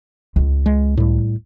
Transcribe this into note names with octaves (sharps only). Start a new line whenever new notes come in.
C#2
G#3
A2 G3